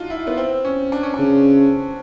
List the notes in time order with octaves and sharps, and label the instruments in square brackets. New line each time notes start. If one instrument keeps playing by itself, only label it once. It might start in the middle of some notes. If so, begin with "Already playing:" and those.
Already playing: [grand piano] D4 D#4 F4 F#4
E4
B3
C4
C#4
D4
C#4
D4
[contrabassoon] C#3